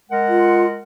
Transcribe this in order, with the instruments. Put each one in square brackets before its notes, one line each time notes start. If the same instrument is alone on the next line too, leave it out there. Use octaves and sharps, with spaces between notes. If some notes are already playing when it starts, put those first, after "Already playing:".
[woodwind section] G#3 A#4 F#5
[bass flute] F4